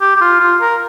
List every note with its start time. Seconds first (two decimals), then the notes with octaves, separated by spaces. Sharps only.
0.01 G4
0.17 G4
0.21 F4
0.40 F4
0.61 A#4